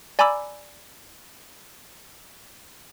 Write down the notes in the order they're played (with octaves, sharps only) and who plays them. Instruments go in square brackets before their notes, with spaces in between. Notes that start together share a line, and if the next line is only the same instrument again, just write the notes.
[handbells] D5 G#5 A#5 B5 D6 E6